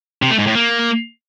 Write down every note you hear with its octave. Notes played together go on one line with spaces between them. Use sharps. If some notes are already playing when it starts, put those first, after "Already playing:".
C3
A3
G#2
A2
A#3